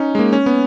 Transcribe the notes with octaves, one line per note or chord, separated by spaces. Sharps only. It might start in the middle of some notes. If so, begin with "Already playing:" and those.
Already playing: C#4 D#4
G#3
A#3
C#4
B3